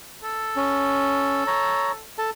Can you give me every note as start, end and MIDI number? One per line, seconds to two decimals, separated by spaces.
0.24 2.03 69
0.56 1.44 61
1.47 1.92 73
1.47 1.92 82
2.18 2.30 69
2.18 2.30 81